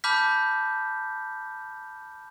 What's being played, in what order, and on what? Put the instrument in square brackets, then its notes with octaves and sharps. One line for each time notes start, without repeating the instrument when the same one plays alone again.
[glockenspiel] A5 B5 D6 F6 G6 B6